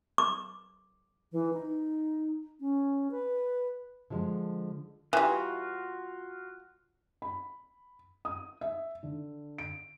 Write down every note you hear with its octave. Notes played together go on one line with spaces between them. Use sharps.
D6
E3
D#4
C#4
B4
D3 F3 G#3
E3 G3 F4 F#4
B5
D#6
E5
D3
D7